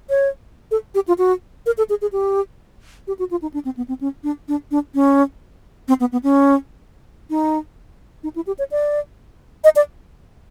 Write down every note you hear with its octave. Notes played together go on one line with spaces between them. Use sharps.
C#5
A4
G4
F4
F#4
A#4
A4
G#4
G#4
G4
G4
F#4
F4
D#4
D4
C4
B3
C4
C#4
D4
D4
D4
C#4
C4
B3
B3
C#4
D#4
D#4
E4
G4
C#5
D5
D#5
D5